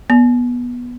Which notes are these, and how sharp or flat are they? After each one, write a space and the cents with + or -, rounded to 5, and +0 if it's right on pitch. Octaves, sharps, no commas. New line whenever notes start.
B3 -15